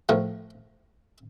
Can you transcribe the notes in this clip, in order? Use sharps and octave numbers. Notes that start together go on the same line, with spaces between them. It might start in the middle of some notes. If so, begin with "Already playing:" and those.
A2 F3 A3 A#4